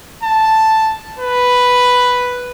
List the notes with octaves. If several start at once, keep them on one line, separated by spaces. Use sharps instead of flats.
A5
B4